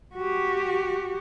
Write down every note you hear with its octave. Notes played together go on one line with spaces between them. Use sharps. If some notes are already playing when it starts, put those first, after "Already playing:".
F#4 G4